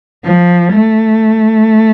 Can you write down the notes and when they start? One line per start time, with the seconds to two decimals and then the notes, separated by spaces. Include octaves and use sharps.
0.25 F3
0.73 A3